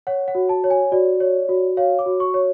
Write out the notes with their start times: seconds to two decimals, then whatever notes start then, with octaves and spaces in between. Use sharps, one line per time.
0.07 C#5 F#5
0.28 F#5
0.35 F#4
0.49 A5
0.64 C#5
0.70 G#5
0.92 F#4 D5
1.20 C#5
1.49 F#4
1.77 C#5 F5
1.99 D6
2.06 F#4
2.20 C#6
2.34 C#5